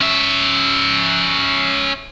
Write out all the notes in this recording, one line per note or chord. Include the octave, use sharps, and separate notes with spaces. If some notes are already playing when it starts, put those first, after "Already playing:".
C#4 E5